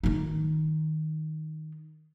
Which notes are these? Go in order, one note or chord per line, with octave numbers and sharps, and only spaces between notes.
D#3 D#4